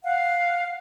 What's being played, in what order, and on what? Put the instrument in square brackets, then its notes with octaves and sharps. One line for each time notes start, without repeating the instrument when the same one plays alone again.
[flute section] F5 F#5